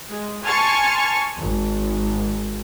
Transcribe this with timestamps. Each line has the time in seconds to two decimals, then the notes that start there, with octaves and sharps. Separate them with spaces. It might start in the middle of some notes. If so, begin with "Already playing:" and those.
0.10 G#3
0.45 G#5 A5 C6 C#6 F6 A6
1.38 G#1